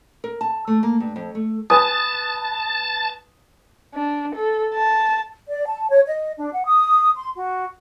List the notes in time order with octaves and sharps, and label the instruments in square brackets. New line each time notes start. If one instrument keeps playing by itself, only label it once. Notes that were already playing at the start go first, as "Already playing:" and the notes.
[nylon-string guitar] A#4
A5
A3
A#3
G2
F2
A3
[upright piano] B4 G#5 D#6 [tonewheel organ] A5
[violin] D4
A4
A5
[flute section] D5
A5
C#5
D#5
D4
F#5
D#6
C6
F#4